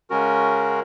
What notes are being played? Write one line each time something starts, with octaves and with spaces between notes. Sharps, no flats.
C#3 G#3 C#4 F#4 A#4